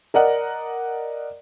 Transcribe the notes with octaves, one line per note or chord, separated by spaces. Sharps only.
A#4 D5 D#5 F#5